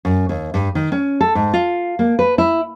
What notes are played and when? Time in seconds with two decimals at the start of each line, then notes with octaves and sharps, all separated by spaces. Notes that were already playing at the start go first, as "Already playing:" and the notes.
0.05 F#2
0.29 D#2
0.54 G2
0.75 D#3
0.92 C#4
1.21 A4
1.35 G#2
1.54 F4
1.99 A#3
2.19 B4
2.38 E4